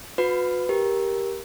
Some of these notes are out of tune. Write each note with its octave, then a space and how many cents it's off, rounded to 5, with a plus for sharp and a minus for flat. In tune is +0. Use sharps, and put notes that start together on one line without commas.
F#4 -40 B4 +15
G4 +0 A#4 +10